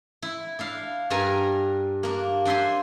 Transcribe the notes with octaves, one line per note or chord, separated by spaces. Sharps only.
E4
D4 E4 F5
G2 G3 D4 A#4 G#5 A#5
A#3 D4
D4 C5 E5 G#5 C6